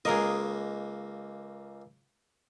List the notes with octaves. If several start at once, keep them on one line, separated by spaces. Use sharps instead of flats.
C#2 A#3 G#4 A#4 D#5